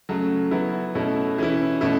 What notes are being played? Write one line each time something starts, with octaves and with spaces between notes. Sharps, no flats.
C#3 F#3 A3
F#3 B3 E4
B2 A3 C#4 E4
E3 C#4 E4
B2 A3 C#4 E4